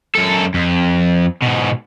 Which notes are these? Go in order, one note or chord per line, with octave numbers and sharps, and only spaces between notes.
F#2 A4
F2
G#2 B2